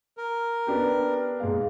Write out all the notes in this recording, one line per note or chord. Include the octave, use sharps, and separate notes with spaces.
A#4
B3 D4 G4
G#2 G#3 F5